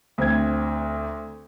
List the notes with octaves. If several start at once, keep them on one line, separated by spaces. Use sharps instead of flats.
D2 C4 C5 G#6